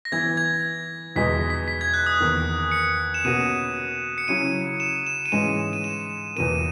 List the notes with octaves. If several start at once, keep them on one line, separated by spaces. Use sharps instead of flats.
A#6
E3 B3 E4 G#6
G#6
E2 B2 G#3 D#4 B6
B6
B6
G#6
F#6
D#6
E2 D#3 A#3
C#7
E7
B2 A#3 C#4 F#4 D#7
C#7
C#3 F#3 C#4 E4 D#7
E7
E7
D#7
G#2 E3 G#3 C#4 E7
D#7
E7
E2 B2 A#3 D#7